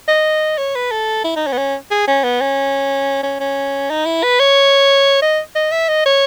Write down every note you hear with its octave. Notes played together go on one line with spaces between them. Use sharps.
D#5
C#5
B4
A4
E4
D#4
C#4
B3
C#4
G#4
C#4
B3
C#4
C#4
C#4
D#4
E4
B4
C#5
D#5
D#5
E5
D#5
C#5